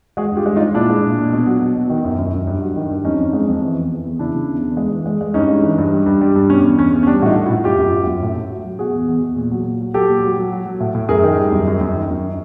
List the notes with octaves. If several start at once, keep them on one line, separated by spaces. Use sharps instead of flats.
G#3 F#4 G#4
G2
F4 G4
G#3
D#4 F4
G#3
A#2 D4 E4
G#3
A#2
A#2
B2
F#3
F#3
B2
D#3
F#2
F#2
F#2
G2
F#3
D#3
G2
F2 C#4 D#4
F2
G#3
F2
E3
E2
E3
E2
C#3 D4 E4
C#3
E2
E2
G#3
E3
G#3
G#3
G2 C#4 D#4
G#3
E3
G2
G3
G2
G3
G2
B2 C#4
E2
E2 C#4
E2
C#4
G3 D4
A2 D#4 F4 F#4
A2
E4 F#4
A2
F#2 F4 G4
F#2
F#3
F#2
A2
A2
F#3
F#3
B2 F#4 G#4
E2
E2
E2
A#2
F#3
A#2
F#3
F#3 G4 A4
A#2
F#3
F#3
F#3
F#3
A2
A2
F#2 G#4 A#4
D#3
G3
F#2
F#2
F#2
D#3
F#2